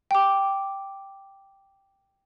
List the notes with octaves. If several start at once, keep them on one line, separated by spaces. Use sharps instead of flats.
G5 D6